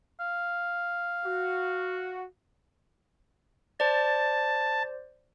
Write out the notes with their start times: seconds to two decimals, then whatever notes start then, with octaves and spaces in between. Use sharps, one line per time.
0.20 F5
1.26 F#4
3.80 C5 D5 A5